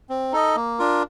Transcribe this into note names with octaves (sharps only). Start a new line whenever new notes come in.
C4
D#4 A4 D#5
A#3
D4 F4 A#4